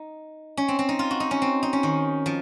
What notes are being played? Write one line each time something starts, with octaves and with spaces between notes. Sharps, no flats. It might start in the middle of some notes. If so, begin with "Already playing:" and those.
Already playing: D#4
C#4
C4
C4
D#4
F4
F#4
D#4
C#4
C4
D#4
C#4
D#3
F3